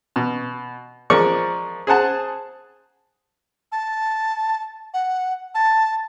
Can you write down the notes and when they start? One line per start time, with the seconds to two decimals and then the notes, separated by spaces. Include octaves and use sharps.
0.16 B2
1.10 F3 G#3 A#4 D5 C#6
1.87 G#4 C5 F#5 A5
3.72 A5
4.94 F#5
5.55 A5